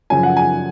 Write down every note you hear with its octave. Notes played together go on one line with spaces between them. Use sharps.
F#2 C#3 F3 G#5
F#5
G#5